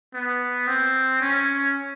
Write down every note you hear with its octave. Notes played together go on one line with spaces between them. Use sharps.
B3
C4
C#4